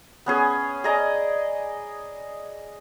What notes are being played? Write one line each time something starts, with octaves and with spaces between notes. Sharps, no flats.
B3 C#4 G#4
G#4 D5 D#5 A#5